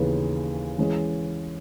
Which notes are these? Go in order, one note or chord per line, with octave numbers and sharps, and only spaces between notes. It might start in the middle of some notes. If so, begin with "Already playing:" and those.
Already playing: D#2 C#3 E3 B3
E3 G#3 C#4